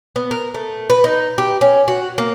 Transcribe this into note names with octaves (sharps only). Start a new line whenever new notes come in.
B3
A#4
A3
B4
D#4
G4
C#4
F#4
A#3